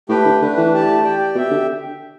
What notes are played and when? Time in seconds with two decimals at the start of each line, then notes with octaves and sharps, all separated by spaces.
0.09 A2 A3 G4 B4 G5
0.25 D3
0.41 D3 A3 D4 B4
0.57 E3
0.72 A3 G4 D5 A5
1.03 G4 D5 G5
1.35 B2 G4 E5 G5
1.51 D3